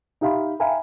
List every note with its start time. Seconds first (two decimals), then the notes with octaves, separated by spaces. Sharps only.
0.21 D#4 G4 E5 F5 B5 C6
0.60 E5 F5 G5 G#5 A#5 B5